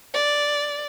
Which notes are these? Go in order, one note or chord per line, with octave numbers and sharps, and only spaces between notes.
D5